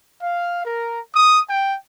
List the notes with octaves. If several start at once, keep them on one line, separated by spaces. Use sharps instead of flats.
F5
A#4
D#6
G5